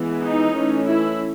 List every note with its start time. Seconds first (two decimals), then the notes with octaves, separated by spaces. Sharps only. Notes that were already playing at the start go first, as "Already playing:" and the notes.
Already playing: E3 G#3 B3
0.21 D#4
0.55 E3 A3 C#4
0.89 E4